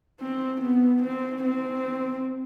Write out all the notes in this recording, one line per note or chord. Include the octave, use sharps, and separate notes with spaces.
C4
B3
C4
C4